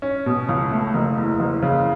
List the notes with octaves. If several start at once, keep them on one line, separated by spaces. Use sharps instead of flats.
C#4
B2
C#2
A3
F#1
E2
F#1
C#3